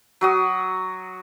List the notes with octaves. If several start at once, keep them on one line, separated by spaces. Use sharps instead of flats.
F#3 F#4 D#6